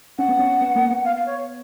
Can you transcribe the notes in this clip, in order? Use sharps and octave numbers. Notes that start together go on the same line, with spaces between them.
C#4 F#5
B3
C#4
B3
A#3
B3
F5
F5
C#5